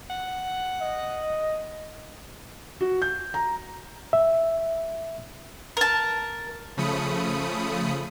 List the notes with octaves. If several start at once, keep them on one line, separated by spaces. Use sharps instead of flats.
F#5
D#5
F#4
G6
A#5
E5
A#4 A5
C#3 F3 A3 B5 D#6 C#7